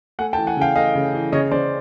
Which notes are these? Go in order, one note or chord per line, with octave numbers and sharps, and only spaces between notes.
A3 F#5 G#5
G5 A5
E3
F#5 G#5
C#3 F5 G5
A3 D#5 F5
C#3
E3
C#3 C#5 D#5
C#3 C5 D5